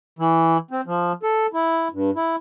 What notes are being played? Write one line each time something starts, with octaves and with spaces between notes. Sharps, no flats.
E3
C4
F3
A4
E4
G2
E4